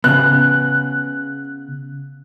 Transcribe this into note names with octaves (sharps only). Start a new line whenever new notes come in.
C#3 B3 F#6